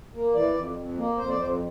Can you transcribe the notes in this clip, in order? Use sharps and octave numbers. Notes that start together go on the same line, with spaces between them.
A#3
E3 D5
F2
F2
A#3
F2 C5
D5
F2 C5